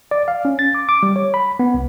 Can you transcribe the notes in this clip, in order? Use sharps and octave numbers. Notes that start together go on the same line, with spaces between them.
D5
F5
C#4
A6
D6
D6
G3
C#5
B5
B3
C2